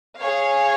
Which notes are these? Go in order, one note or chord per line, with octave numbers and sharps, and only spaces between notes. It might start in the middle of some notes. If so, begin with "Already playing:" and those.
G#4 C#5 F5